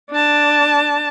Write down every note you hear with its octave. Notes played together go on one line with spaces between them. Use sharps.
D4 A5